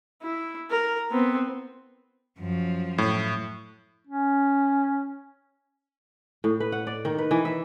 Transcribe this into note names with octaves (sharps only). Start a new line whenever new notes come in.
E4
A#4
B3 C4
F#2 F3
A2
C#4
A2
B4
F#5
D5
D#3
B4
E3
E5